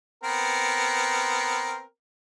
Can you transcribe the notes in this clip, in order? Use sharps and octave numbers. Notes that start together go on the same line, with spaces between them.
B3 C4 A#4